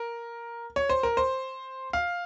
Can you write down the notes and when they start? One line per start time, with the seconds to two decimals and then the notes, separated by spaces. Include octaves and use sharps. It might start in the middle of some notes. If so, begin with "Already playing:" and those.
Already playing: A#4
0.76 C#5
0.89 C5
1.03 A#4
1.17 C5
1.93 F5